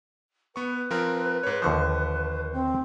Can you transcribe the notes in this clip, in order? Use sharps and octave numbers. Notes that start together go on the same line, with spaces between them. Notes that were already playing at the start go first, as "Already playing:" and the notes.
B3 B4 C#6
F3 C4 A#4
G#2 C#5
D#2 D3 F3 C5 C#6
C4